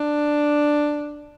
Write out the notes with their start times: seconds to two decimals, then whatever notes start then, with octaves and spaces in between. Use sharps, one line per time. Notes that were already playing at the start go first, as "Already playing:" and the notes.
Already playing: D4